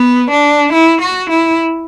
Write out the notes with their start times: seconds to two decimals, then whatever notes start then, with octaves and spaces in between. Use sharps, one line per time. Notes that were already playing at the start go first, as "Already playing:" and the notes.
Already playing: B3
0.31 D4
0.73 E4
1.01 F#4
1.30 E4